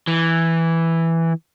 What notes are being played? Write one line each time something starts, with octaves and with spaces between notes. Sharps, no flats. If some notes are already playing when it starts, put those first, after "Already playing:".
E3